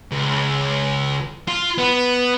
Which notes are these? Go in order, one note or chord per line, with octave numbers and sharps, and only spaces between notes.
C#2
F4
B3